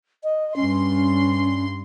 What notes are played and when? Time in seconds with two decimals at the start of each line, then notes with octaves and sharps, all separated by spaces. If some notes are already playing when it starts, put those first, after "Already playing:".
0.24 D#5
0.56 G2 C#4 C6